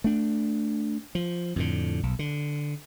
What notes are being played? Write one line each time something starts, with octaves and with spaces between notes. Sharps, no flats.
A3 D4
F3
F2 A2 D3
B1
D3